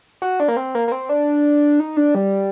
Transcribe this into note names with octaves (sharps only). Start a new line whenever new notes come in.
F#4
D4
A#3
C4
A#3
A#3
C4
D4
D#4
D4
G3